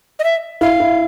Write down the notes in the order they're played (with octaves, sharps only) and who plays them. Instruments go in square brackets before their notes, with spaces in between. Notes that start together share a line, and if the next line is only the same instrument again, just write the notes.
[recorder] D#5
E5
[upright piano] E4 [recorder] F5
[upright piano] E4